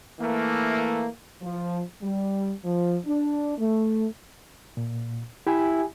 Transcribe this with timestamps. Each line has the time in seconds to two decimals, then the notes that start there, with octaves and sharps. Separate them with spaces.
0.20 E3 A3 A#3
1.42 F3
2.02 G3
2.65 F3
3.06 D4
3.58 A3
4.77 A#2
5.47 E4 G4 G#5